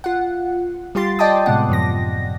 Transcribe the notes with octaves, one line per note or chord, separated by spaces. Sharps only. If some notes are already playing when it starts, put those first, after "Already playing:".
F4 F#5
G3 F4 G4 C6 A6
D5 D#5 G5 A5 D6 D#6
A2 C3 G#3 B3 F#5
F#2 A2 F3 A#6